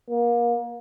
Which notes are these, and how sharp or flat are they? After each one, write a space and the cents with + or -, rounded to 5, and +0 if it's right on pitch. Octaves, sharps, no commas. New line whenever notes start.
A#3 +30